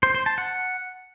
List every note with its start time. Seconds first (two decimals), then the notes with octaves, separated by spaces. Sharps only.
0.03 C5
0.15 C5
0.26 A5
0.38 F#5